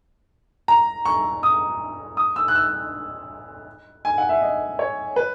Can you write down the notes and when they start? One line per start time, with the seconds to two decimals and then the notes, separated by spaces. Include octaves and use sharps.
0.68 A#5
1.05 C#6
1.43 D#6
2.17 D#6
2.36 E6
2.48 F#6
2.55 E6
4.05 G#5
4.18 F#5
4.29 E5
4.41 D#5
4.79 C#5
5.16 B4